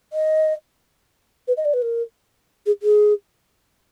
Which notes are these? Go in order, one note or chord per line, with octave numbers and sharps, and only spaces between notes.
D#5
B4
D#5
D5
B4
A#4
G#4
G#4